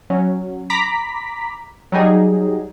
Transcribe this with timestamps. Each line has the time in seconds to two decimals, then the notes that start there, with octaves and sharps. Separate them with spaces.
0.10 F#3 C#4
0.70 A#5 B5 D6 B6
1.92 F#3 G3 D#4 G#4